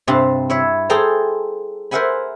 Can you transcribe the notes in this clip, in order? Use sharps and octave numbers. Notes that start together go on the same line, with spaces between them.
G2 C3 C4 A5
E4 C#5 E5
G#4 A4 C5 G5 A5 A#5
A#4 C5 E5 F#5 G#5 B5